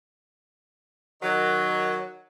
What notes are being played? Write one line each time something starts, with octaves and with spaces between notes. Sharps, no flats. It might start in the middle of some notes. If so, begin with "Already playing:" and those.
D#3 F#3